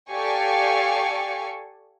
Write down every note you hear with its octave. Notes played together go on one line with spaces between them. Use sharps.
G4 A4 D5 F5 G#5 C#6